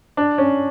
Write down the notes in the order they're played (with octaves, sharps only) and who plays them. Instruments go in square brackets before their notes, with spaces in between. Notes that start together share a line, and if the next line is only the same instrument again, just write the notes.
[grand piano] D4
C#4